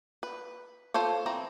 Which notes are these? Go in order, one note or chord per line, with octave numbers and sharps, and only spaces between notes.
B4
F4 A4 C5 C#5
E3 C4 A#5